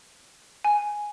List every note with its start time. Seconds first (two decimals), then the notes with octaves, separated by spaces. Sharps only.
0.65 G#5